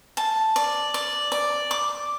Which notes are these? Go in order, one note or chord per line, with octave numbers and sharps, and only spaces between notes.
A5
D5
D5
D5
D6